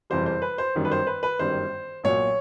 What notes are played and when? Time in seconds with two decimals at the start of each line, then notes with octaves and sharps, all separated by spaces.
0.10 F#1 F2 C3 E3 G3 C5
0.26 C5
0.42 B4
0.58 C5
0.75 G1 F#2 D#3 G3
0.85 B4
0.92 C5
1.07 B4
1.23 B4
1.39 G1 F#2 D#3 G3 C5
2.04 B1 A#2 F#3 C#5